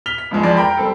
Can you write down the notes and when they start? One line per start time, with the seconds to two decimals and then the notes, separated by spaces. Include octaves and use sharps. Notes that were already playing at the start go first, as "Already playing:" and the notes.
0.06 F6 B6 F7 G7
0.18 B6
0.31 C#2 G2 F3 G#3
0.43 F2 E3 G#3 D5
0.57 A#4 G5 A#5 B5
0.77 G3 C4 A4